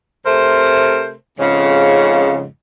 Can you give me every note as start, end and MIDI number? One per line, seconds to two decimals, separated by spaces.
0.25 1.12 48
0.25 1.12 57
0.25 1.12 70
0.25 1.12 72
1.39 2.45 41
1.39 2.45 44
1.39 2.45 49